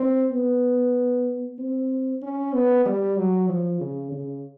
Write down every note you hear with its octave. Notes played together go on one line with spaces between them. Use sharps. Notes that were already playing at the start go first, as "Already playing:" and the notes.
Already playing: C4
B3
C4
C#4
B3
G3
F#3
F3
C#3
C#3